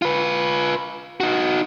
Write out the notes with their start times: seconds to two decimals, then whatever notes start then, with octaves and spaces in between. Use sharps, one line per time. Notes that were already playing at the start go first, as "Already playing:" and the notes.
0.02 F4 B4
1.20 D#4 F#4